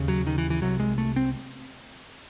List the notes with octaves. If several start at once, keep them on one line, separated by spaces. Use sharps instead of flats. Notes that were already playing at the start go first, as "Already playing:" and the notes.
Already playing: D#2 C#3
F#3
D#3
E3
E3
C2 C3 F#3
G#3
A3
C4